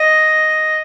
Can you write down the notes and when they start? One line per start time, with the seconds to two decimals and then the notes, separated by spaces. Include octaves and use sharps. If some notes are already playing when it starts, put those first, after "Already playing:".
Already playing: D#5